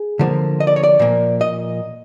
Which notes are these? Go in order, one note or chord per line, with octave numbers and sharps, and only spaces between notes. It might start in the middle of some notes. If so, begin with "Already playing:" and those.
Already playing: G#4
D3 F3 A#3
D#5
D5
C#5
D5
A#2 F3 A#3
D#5